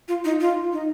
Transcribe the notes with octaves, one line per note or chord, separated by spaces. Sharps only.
F4
D#4
F4
D#4